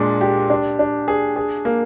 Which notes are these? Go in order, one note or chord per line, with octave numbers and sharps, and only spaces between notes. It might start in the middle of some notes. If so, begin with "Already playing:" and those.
Already playing: A#2 G#3 D4
G4
D4
D4
G#4
G#4
A#3